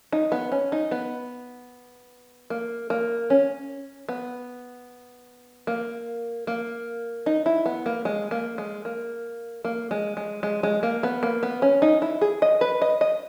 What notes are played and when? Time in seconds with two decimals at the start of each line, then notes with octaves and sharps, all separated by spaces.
0.13 D#4
0.32 B3
0.52 C#4
0.72 D#4
0.91 B3
2.50 A#3
2.90 A#3
3.30 C#4
4.09 B3
5.67 A#3
6.47 A#3
7.26 D#4
7.46 E4
7.66 B3
7.86 A#3
8.05 G#3
8.31 A#3
8.58 G#3
8.85 A#3
9.65 A#3
9.91 G#3
10.17 G#3
10.43 G#3
10.63 G#3
10.83 A#3
11.03 B3
11.23 A#3
11.43 B3
11.62 C#4
11.82 D#4
12.02 E4
12.21 G#4
12.42 D#5
12.61 B4
12.82 D#5
13.01 D#5